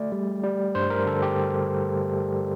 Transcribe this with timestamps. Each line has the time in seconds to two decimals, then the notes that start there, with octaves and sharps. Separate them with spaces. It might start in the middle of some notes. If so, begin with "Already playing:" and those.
Already playing: A3 D5
0.12 G3
0.44 G3
0.75 G2 C5
0.90 A#4
1.06 D3 A4
1.22 G4